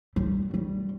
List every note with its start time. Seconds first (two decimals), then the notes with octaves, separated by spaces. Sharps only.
0.16 G3
0.54 G3